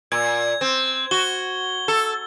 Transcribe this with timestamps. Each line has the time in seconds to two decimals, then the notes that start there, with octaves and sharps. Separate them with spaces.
0.12 A#2 G#6
0.61 C4
1.11 F#4 G7
1.88 A4